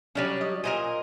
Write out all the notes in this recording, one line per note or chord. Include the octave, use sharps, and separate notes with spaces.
F#3 G3 C#4 D4 D5
D#5
A#2 A#4 C5 D#5 G#5